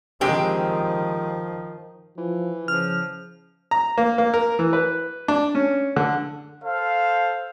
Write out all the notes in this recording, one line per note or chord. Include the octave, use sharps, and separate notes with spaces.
D#3 F3 G#3 C4 G4
E3 F3
C#3 F3 F6
A#5
A#3
A#3
A#4
E3
B4
D4
C#4
D3
A4 C5 F5